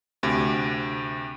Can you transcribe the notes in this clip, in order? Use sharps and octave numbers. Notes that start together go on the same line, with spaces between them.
D2 C3